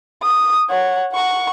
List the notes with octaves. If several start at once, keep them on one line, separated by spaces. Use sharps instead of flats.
D#6
C#5 F#5
F#5 C#6